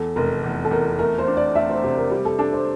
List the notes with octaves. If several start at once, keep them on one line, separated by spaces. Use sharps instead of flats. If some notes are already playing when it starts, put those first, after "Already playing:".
Already playing: E2 A4
F1 A#4
E2
A4
E2 A#4
A3 A#4
C5
D4
D5
A3 E5
C5
C3 C5
A#4
G3 G4
A4
D4 A4
C5